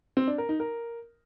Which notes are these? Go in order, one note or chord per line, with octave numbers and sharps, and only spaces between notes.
C4
D4
A#4
D#4
A#4